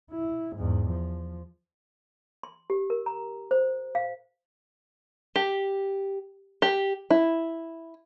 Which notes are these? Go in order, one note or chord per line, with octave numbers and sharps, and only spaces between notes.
E4
E2 G#2
F3
C6
G4
A#4
A#5
C5
F5
G4
G4
E4